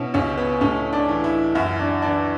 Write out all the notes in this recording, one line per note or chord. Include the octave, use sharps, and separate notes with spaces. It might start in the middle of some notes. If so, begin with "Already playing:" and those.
Already playing: B2 C#4 E4
C#2 C#4
B3
A2 C#4
D4
E3
E4
F#2 E4
D4
E3 D4